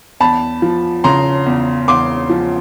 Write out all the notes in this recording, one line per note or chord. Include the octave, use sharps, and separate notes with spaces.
E2 A5 B5
F3
C#3 A#5 C6
E2
E2 C6 D6
F3